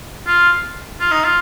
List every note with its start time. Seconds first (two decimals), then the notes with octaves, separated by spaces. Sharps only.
0.27 F4
1.00 F4
1.11 D#4
1.24 F4